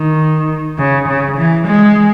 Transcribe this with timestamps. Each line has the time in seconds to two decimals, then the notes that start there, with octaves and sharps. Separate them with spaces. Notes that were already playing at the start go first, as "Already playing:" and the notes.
Already playing: D#3
0.78 C#3
1.07 C#3
1.37 E3
1.67 G#3